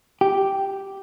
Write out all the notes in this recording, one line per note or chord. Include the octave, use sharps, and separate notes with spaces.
G4